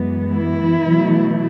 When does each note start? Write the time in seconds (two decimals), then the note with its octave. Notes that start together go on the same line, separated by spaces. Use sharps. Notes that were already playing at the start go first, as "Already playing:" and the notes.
Already playing: F#2 E3 G#3 B3
0.33 E3 E4
0.85 B2 F#3 A3